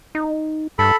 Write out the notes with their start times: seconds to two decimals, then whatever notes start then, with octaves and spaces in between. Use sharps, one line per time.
0.15 D#4
0.79 G2 A4 B5